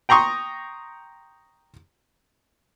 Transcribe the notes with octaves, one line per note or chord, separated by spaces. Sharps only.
G5 A#5 C6 C#6 D#6